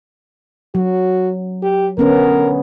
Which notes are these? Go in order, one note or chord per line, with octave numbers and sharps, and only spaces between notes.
F#3 F#4
G4
D3 B3 C#4 A#4